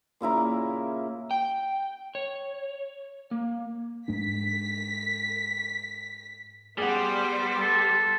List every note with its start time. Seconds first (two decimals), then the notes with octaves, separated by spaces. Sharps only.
0.21 A#2 C#3 E4 A#4
1.31 G5
2.15 C#5
3.31 A#3
4.08 G#2 G#3 D4 B6
6.78 G3 B3 G#4 C5 F#5
7.60 A4